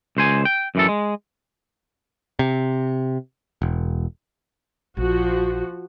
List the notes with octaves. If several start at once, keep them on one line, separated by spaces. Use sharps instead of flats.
C#2 C5 G#5
G5
F#2 E3 A4
G#3
C3
E1
A#1 F3 F#4